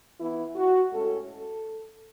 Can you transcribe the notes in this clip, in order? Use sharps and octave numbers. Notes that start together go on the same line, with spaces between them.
E3 B3 E4
F#4
A2 G#3 C#4 A4
A4